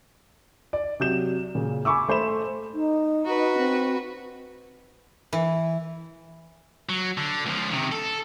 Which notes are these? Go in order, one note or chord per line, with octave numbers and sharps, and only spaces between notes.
D5
C3 F#3 G6 E7
A#2 C#3
G#5 B5 C#6 D6 E6
A3 C5 B5 E7
D#4
F#4 B4
C4
E3
F#3
D3
C#2 F3
C3 D#3
A4